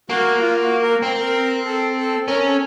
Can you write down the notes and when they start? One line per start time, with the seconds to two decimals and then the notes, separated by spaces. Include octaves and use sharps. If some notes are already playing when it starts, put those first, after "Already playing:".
0.10 A#3 F#4
0.41 F4
0.61 F#4
0.82 A#4
1.03 C4 A#4
1.20 A#4
1.65 A4
1.97 A4
2.28 C#4 A#4
2.44 A4